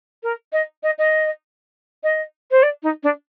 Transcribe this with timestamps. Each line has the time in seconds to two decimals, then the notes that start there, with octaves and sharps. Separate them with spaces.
0.23 A#4
0.53 D#5
0.83 D#5
0.98 D#5
2.03 D#5
2.51 C5
2.63 D5
2.83 D#4
3.03 D4